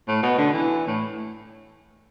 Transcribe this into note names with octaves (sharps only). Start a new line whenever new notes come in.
A2
B2
D3
E3
A2